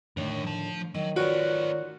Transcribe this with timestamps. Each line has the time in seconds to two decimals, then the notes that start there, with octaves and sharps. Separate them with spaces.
0.17 A2 D3 D#3 A#4 C#5
0.43 F3 A5
0.95 D#3 F#3 D#5
1.16 A3 F4 F#4 B4 C#5 D5